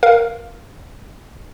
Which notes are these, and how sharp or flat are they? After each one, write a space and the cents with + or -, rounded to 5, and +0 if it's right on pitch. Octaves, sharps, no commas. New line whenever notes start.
A#4 +0 F5 +0